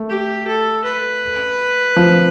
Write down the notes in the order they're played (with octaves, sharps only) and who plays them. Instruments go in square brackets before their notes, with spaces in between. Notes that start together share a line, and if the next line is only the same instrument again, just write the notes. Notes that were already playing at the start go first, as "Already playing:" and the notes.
Already playing: [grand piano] A3
[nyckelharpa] G4
A4
B4
[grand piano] F3